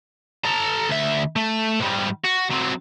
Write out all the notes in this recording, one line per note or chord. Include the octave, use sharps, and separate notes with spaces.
A4 A#5
D2 E5
A3
G#2 G3
F#4
F#3 C4